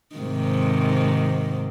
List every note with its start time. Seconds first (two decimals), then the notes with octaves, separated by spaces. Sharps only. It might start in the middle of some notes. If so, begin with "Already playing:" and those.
0.16 G#2 C3 D#3